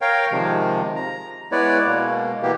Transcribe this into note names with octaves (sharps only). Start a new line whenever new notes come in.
A#4 C#5 F5 G5
C3 D#3 F3 G#3
A#5
G#3 B3 E4 B4 C#5 D5
B2 G#3 A#3
B2 E3 A#3 B3 G4